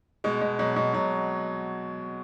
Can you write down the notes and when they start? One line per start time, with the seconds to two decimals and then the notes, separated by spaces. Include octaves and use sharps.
0.24 B2 G#3
0.41 B2
0.59 B2 F#3
0.76 B2
0.94 B2 F#3